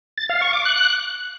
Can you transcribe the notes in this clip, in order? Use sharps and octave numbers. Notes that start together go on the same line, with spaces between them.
A6
F5
C#6
D6
F#6